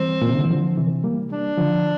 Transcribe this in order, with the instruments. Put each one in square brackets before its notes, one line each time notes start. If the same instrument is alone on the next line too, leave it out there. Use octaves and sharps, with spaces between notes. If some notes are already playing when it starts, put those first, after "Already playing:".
Already playing: [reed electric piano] E3 G3 [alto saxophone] C4
[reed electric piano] A#2
C3
D3
E3
D3 F3
C3 E3
G3 A#3
[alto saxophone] D4
[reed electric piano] D3 F3